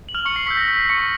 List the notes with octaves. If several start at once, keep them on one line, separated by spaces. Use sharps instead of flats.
F#7
F6 F7
C#6 C#7
C7
C#6 E6 G6 B6
A#6
B6
C7
C#6 C#7